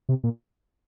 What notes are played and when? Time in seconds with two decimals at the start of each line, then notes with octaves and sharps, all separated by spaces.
0.09 C3
0.24 A#2